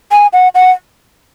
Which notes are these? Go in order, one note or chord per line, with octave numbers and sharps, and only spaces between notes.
G#5
F#5
F#5